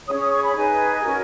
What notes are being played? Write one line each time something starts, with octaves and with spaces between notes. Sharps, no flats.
C#4 G#4 C#5 D#6
D#6
C#6
B5
D#4 G#4 B4 G#5
C#4 F#4 A#4